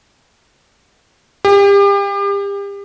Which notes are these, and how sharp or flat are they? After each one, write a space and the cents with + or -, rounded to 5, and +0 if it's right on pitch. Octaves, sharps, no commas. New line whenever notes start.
G4 +35